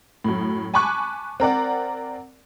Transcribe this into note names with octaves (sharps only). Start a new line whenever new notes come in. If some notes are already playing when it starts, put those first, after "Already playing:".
F#2 A2
G#5 A5 B5 C#6 D6 F#6
C4 A#4 D5 F#5